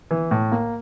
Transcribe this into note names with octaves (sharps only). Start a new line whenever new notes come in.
E3
A2
A#3